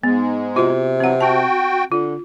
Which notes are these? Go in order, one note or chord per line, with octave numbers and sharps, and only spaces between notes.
G#2 G#3 B3
C3 F4 F#4
E3 F#3 C4 F#5
F#4 G5 A5
D3 F4